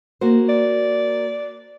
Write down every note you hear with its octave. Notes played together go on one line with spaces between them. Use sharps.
A#3 F#4 C5
D5